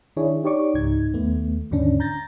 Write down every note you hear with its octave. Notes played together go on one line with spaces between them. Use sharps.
D#3 D4 E4 G#4 C#5
D#4 G4 C#5 D5 C#6 D6
C#2 G#2 D#4 G#6
D#2 A3 B3
D#2 G#2 D3 C#4 D4
A#5 G6 A6 A#6